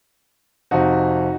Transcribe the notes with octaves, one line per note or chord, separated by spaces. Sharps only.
F2 C3 F3 D#4 F#4